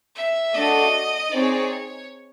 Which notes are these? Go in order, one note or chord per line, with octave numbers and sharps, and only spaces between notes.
E5
A3 D4 F#4 A4 D5 D#5
C4 D#4 G#4 C#5 D5
C#5